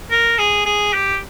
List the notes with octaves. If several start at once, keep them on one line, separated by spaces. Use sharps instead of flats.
A#4
G#4
G#4
G4